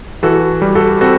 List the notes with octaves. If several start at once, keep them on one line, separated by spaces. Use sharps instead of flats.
E3 F#4 A4
G3
F#4 A4
C4 F#4 A4